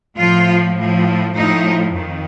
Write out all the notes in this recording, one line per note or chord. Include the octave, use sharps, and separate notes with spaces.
A2 F3 F4
A2 F3
A2 F3 D#4
F2 D#3